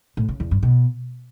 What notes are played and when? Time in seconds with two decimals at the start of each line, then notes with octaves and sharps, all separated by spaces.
0.17 A2
0.29 C#3
0.40 E2
0.51 G2
0.63 B2